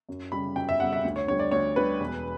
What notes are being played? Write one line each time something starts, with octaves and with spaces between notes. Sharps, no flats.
F#2
C#3 G3 B5
F#2 G5
E5
C#3 G3 F#5
E5
D2
C#5
D3 G3 C#5
D5
D2 C#5
D3 G3 B4
E1